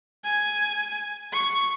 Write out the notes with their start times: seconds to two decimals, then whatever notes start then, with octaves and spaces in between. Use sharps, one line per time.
0.24 G#5
1.33 C#6